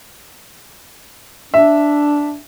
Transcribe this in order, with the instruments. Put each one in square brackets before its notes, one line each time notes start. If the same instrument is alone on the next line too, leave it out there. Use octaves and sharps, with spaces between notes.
[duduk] D4 [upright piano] E5